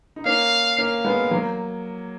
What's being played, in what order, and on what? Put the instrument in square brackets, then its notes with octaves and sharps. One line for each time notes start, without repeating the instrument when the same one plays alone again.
[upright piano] D#4
[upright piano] A#3 C#4 [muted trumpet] F5
[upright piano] A#3 C#4 [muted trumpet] F5
[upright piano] G#3 B3
F#3 A#3